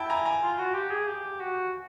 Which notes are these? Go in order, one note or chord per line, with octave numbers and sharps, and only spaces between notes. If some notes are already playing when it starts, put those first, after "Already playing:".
Already playing: E4 G5 A5
G#5 A#5
G#5 A#5
F4
F#4
G4
G#4
G4
F#4